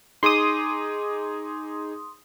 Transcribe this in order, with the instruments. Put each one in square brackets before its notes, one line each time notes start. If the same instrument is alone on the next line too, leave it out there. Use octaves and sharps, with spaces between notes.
[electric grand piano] D#4 G#4 D6 [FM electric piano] C6 D#6